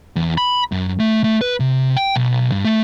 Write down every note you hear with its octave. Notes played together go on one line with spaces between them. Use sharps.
E2
B5
F#2
A3
A3
B4
C3
G5
B1
G2
A3